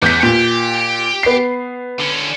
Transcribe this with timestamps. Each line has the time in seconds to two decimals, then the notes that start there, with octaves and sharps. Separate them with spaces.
0.02 E2 G#3 C#4 G6 B6
0.23 A#2 G4
1.23 B3 C7
2.00 D3 C#4